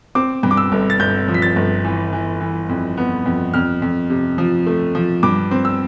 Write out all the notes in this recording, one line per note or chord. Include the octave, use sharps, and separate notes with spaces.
C4 D6
G2
D6
E6
G1
A6
G1 G6
F3
B6
A6
G1
E3
E3
E3
F2
B3
F2
F2 F6
F2
C3
F3
A3
F3
G2 D6
C4
E6